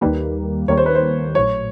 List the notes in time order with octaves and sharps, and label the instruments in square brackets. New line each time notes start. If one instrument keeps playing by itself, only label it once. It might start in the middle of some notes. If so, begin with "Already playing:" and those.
[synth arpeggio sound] D#2 D#3 G3 A#3 [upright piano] B4
[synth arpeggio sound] D#2 D#3 G3 A#3 [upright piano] C#5
[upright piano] C5
B4
C5
[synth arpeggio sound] A#1 A2 F#3 [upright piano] C#5